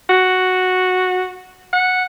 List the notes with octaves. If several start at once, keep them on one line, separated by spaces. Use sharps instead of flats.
F#4
F#5